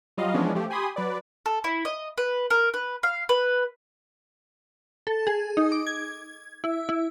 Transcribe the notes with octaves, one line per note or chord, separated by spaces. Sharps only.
F#3 G3 F4 D#5 F5
E3 F3 G#3 B3 C#4 D4
F3 A3 G4
G4 G#5 B5 C6 D#6
F#3 B4 D5
A4
E4
D#5
B4
A#4
B4
F5
B4
A4
G#4
D#4
D6
G#6
E4
E4